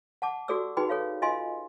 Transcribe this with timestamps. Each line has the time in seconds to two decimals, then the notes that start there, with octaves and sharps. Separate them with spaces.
0.22 F#5 A5 D6
0.48 F#4 G4 A4 D5 D6 E6
0.77 D#4 F#4 G#4 B4 G5 B5
0.89 A4 C#5 F5
1.22 F4 D#5 F5 G#5 C6